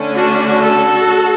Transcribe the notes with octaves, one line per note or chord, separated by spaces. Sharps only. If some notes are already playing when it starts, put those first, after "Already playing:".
Already playing: D3 A3 C#4
D4 F#4
F#4 A4